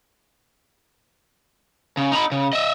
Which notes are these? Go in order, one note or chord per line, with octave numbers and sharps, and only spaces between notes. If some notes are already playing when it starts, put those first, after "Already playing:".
C#3
D#4 B5
C#3
D#5 E5